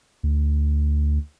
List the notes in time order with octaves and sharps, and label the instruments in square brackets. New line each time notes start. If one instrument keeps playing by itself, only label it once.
[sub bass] D2